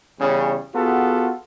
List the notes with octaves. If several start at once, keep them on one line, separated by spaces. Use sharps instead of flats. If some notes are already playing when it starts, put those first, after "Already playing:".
E2 C#3 G3 C#4
B3 F4 F#4 G#4 A4